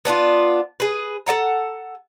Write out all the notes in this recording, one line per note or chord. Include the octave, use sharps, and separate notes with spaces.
B3 D4 D#4 F4
G#4 B4
A4 D5 F#5 A#5